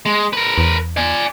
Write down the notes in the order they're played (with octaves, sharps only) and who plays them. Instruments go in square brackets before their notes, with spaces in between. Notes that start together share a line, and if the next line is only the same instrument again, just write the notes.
[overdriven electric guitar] G#3
A#4 B4
[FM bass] E2
[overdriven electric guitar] D5 G#5